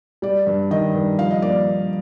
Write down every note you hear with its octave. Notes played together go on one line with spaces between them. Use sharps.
G3 D5
G2
D#3 D#5
G2
F3 F5
D#5
A#3 D5